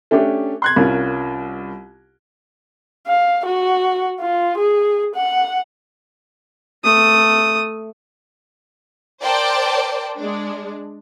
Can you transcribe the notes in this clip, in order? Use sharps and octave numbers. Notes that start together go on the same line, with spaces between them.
A3 C#4 D4 G4
C6 F#6 G#6
C2 C#4 F4 A#4
F5
F#4
F4
G#4
F#5
A3 D#6
A#4 C5 D5 G5 A5
G#3 D4